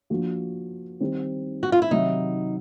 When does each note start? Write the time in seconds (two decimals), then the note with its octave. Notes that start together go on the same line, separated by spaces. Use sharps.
0.10 F3 A#3 D4 F#4
1.01 D#3 G3 C4 D#4
1.63 F#4
1.72 F4
1.82 E4
1.91 C3 D#3 F#3 D#4